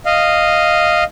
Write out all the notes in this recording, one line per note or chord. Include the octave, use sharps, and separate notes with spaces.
D#5 F5